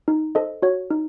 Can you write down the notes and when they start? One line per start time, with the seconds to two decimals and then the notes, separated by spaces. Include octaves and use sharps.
0.08 D#4
0.35 A4 C5 D#5
0.62 F#4 C#5
0.91 D#4